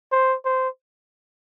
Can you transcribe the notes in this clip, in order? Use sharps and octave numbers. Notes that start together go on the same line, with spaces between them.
C5
C5